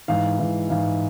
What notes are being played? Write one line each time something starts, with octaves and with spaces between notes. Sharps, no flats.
G#2 E3 F5
G#2 E3
G#2 E3 F5